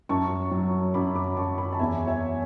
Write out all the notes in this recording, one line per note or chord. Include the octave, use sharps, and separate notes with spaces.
F#2 A5 C#6
F#3
F#2 B5 D6
B5 D6
F#2 A5 C#6
G#5 B5
A5
E2 E5 G#5
C#5 E5